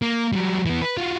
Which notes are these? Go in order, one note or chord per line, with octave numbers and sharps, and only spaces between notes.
A#3
F#3 G3
E3 B3
B4
F4 F#4